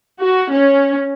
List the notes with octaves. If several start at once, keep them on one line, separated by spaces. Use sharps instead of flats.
F#4
C#4